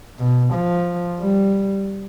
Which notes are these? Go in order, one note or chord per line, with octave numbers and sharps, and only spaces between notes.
B2
F3
G3